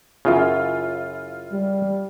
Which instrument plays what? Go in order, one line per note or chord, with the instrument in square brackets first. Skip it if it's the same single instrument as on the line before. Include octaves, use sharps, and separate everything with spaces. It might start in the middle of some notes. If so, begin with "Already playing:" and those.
[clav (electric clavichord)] F#2 C#3 [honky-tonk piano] E4 F4 E5
[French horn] G3